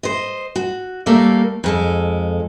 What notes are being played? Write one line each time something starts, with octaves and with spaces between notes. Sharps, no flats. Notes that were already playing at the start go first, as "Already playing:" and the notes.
C5 D#5
F#4
G3 A3 A#3 A4 A#4 D5
F2 G#3 A4